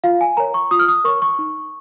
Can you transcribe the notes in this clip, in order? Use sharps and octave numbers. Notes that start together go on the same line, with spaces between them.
F4 F5
G#5
A#4 C#5 A#5
C#6
F4 D#6
F6
D#6
A#4 C#5 C#6
C#6
D#4